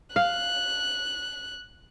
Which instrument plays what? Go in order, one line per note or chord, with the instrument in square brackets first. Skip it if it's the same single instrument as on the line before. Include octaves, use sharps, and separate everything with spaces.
[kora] F5 [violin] F#6